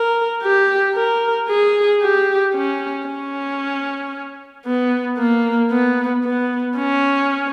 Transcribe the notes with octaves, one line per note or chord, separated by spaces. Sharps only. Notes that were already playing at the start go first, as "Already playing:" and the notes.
Already playing: A#4
G4
A#4
G#4
G4
C#4
C#4
B3
A#3
B3
B3
C#4